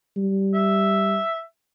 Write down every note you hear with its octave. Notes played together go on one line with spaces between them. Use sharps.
G3
E5